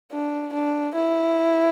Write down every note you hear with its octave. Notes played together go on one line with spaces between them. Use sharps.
D4
D4
E4